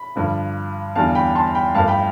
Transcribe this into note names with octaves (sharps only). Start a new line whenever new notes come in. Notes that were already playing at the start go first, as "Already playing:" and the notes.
Already playing: B5
G2 D3 F3
E2 D3 G3 F5 A5
G5 B5
A5 C6
G5 B5
G2 F3 A3 F5 A5
G5 B5